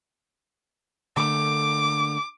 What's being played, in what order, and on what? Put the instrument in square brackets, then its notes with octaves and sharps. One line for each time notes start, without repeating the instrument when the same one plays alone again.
[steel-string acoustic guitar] D3 A3 A#3 [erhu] D6